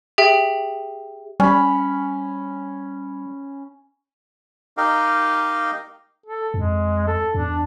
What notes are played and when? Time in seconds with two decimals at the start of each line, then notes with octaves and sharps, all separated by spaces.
0.18 G4 G#4 E5 G5
1.40 G3 C#4 B5
4.77 D#4 G4 A#4 D#5 F5 G5
6.26 A4
6.54 F2 G#3
7.08 A4
7.35 E2 D4